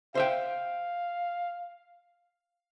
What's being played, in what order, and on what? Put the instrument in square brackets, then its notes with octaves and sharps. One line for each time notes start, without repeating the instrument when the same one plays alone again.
[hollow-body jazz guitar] C5 E5 G5 [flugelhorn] F5